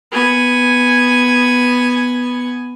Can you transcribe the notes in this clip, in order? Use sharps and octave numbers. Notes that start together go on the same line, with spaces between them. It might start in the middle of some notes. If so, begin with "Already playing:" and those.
B3 G#5